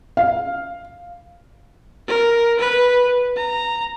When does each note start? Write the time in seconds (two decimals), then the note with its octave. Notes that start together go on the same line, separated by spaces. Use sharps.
0.17 F5
2.08 A#4
2.59 B4
3.36 A#5